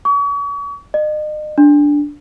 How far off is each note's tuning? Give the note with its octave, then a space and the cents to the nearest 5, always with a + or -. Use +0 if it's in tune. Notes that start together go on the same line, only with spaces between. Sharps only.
C#6 +40
D#5 -40
D4 -5